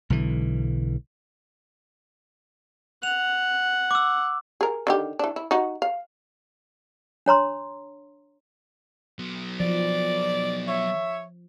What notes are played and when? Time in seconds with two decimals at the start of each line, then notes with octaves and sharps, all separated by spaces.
0.10 B1 D3 E3
3.03 F#5 F7
3.91 D6 E6
4.61 G#4 A#4
4.87 D3 D#3 G4
5.19 E3 D4
5.36 E4
5.51 D#4 F#4
5.82 F5
7.26 D4 C#5 A#5 C6
9.19 F#3 B3
9.60 F3 D5
10.68 C#5 E5